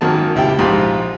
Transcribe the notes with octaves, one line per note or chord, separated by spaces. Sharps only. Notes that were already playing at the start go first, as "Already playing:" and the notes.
G#1 F#2 D#3 A#3 A5
C#2 E4 G4 G5 A5
A#1 G#2 F4 G4 C6